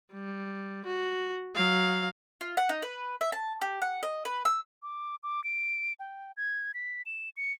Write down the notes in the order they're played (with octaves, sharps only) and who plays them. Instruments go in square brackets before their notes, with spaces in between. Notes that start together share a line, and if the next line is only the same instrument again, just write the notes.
[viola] G3
F#4
F#3 F5
[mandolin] F4
F#5
D#4
B4
E5
A5
G4
F#5
D#5
B4
E6
[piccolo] D6
D6
D7
G5
G#6
B6
E7
C#7